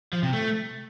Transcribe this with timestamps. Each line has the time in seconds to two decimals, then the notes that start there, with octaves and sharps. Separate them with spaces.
0.13 F3
0.23 C3
0.33 A3